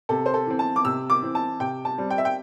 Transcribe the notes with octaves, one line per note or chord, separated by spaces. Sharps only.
C3 A4
C5
A4
E3 C4
A5
D6
C3 E6
D6
E3 C4
A5
C3 G5
A5
G3 C4
G5
E5
G5